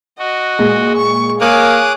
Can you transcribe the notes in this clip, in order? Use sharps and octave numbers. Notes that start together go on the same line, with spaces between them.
F#4 D#5
A#2 G#3
C#6
A#3 G#4 C#5 D6 D#6 F#6